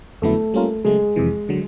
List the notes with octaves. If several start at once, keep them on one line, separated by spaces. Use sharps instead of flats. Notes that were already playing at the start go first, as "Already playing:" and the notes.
F2 D3 F#3 A3 B3 E4
G3 A#3 C#4 F4 A#4
C#3 F#3 G#3 A3
F2 C3 E3
D3 F#3